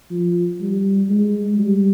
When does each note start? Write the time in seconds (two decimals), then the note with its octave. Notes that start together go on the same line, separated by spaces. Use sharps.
0.10 F3
0.60 G3
1.10 G#3
1.58 G3